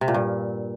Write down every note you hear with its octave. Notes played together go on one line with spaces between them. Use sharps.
C3
A#2
G2